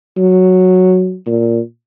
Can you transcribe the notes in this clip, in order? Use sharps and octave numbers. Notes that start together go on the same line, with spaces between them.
F#3
A#2